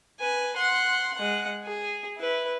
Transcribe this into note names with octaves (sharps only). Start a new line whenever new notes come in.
B4 G#5
F#5 C6
G#3 F#5
G#4
E4 B4